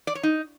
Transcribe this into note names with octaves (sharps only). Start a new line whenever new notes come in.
D5
C#5
D#4